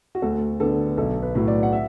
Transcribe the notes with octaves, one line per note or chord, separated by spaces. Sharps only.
F#4
D2 A4
D3 B3 D4 A4
B1 A4
B4
A2 F#3
D5
F#5
E5